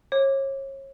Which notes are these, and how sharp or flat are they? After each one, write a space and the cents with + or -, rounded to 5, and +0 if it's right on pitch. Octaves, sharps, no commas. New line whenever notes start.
C#5 -35 D6 +0